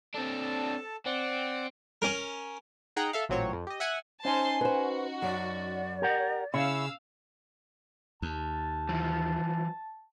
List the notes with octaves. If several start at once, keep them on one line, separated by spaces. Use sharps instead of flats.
C4 D4 A4 A5
C4 D5 F#5
C#4 A#4
D#4 G#4 F#5 G5 A#5
A4 E5 F5
A1 A#2 F#3 C4 C#5
F2
G4 D#5
E5 F#5 G#5
C#4 D#4 C5 G#5 A5 C6
F#4 B4 C5
F#2 D5
G4 A#4 F#5
C#3 E4 C#5 F5 E6
D#2 A5
E3 F3